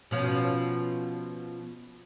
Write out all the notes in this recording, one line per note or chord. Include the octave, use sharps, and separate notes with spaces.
B2 F3 C#4